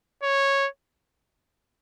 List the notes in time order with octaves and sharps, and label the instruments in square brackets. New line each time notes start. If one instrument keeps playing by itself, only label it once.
[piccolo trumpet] C#5